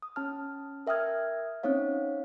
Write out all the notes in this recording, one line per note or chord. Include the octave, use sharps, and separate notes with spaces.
D#6
C#4 A5 F6
A#4 E5 G5 D#6 F6 G#6
C4 C#4 D#4 C#5 F5